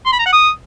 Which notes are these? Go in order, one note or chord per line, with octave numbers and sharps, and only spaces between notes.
C6
B5
A#5
F#5
D#6